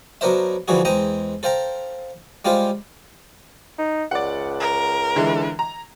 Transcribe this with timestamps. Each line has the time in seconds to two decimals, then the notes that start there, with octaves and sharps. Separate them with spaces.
0.21 F#3 B3 D4 A#4 C5 E5
0.68 D3 E3 F3 G3 F#4 G#4
0.85 E2 G#3 C5 D#5 G5 A#5
1.43 A4 C5 F5 G5 A#5
2.45 G3 G#3 F4 G4 C5 F5
3.78 D#4
4.11 C#2 D5 F#5
4.60 A#4
5.16 D3 E3 G#3
5.59 A#5